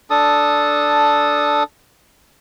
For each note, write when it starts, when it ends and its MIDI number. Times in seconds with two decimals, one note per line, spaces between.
0.10 1.63 62
0.10 1.63 69
0.10 1.63 81
0.10 1.63 87